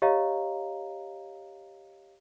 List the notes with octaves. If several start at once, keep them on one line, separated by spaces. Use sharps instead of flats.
G4 C#5 D#5 F5 A#5